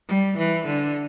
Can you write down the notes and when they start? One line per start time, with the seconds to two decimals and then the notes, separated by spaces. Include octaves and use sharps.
0.09 G3
0.37 E3
0.66 D3